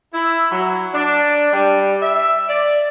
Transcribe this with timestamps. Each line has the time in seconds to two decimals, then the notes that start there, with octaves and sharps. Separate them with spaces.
0.13 E4
0.51 F#3
0.94 D4
1.52 G3
2.02 E5
2.48 D5